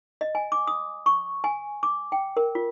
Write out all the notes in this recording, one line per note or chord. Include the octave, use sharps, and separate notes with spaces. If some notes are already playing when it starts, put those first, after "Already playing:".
D#5
G#5
D6
D#6
C#6
G#5
D6
G5
A#4
F4